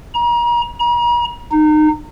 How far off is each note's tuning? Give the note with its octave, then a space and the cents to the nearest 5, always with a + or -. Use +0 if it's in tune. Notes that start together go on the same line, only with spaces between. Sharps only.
A#5 +40
A#5 +45
D#4 -25